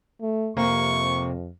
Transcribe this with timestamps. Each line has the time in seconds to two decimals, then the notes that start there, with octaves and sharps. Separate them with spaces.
0.21 A3
0.57 F2 C3 A#3 C#6